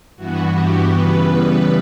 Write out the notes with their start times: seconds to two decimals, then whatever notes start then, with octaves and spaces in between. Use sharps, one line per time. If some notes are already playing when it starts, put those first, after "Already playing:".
0.16 G2 E3 B3 F#4
0.52 G4
0.88 C#3 E3 G3 B3 B4
1.24 B4